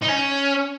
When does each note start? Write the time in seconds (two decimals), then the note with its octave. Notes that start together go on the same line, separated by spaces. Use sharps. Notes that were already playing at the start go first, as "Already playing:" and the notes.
0.02 D#4
0.08 C#4